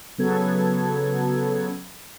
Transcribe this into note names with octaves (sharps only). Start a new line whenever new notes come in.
C#3 F#3 B3 A4 G#6